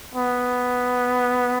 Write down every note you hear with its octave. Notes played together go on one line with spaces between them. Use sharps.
B3